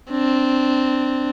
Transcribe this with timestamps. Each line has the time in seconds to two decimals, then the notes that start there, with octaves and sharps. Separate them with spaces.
0.11 C4 D4